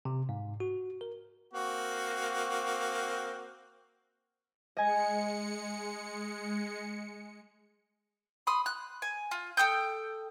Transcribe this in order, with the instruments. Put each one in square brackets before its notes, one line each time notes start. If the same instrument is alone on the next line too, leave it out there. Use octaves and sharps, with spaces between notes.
[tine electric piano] C3
G#2
F#4
A#4
[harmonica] A#3 C4 F#4
[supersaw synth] G#3 C#7 [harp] D#5 G#5 A#6
[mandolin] B5 C6 D#6
F#6
G#5
F4
A4 G5 D#6 G6